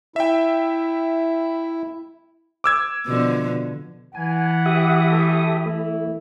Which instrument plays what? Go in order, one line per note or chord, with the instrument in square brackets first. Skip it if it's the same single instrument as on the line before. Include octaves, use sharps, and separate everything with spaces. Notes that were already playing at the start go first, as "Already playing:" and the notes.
[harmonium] E4 [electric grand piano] E5 G5
[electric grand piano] D6 E6 G#6
[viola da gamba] B2 D3 F3
[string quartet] E3 [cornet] F#5 [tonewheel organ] G#5
[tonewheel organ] G4 E5 D#6
[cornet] A3
[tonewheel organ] A3 [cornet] E4